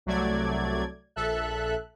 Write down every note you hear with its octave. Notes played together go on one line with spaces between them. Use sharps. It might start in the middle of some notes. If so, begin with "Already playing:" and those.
C2 F#3 A3 D5 G#6
A#1 A4 E5 F#6